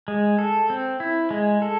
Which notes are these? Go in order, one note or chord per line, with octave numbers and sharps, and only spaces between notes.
G#3
A4
C4
E4
G#3
A4